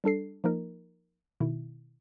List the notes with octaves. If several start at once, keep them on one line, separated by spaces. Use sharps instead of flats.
G3 D4 A4 C7
F3 A#3 D#4 A#4
B2 D#3 E4